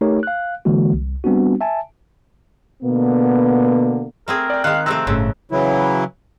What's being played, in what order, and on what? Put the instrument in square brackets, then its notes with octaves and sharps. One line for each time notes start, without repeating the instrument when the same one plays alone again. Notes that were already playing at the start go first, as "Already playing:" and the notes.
[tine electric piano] A3 D#4 G4 A#4 C#5
F5 F#6
D3 E3 G#3 A#3 F#4
C2
G3 B3 C4 D4 F#4
E5 G#5 A5
[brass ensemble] B2 D3 A#3 B3
[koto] A3 C4 G#4 [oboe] A#4
[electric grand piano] D5 G5
[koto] D#3 G#3 [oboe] F5 [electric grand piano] F#6
[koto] C3 F3 A3 [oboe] C4 [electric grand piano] A#5 E6 F#6
[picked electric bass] G1 A2 [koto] C#3
[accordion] C#3 E3 F#3 E4